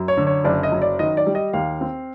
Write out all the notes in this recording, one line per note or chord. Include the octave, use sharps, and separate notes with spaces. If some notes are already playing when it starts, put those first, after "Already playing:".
Already playing: F#2
C#5
D3
C#5
F#1 D5
D#5
F#3
D5
D#3 D#5
D5
G3
D#5
D#2 F5
C4